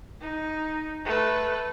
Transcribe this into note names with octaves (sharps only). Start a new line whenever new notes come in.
D#4
A3 B4